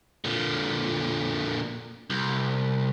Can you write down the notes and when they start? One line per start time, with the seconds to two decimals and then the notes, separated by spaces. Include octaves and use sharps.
0.25 A#2 D3
2.10 C2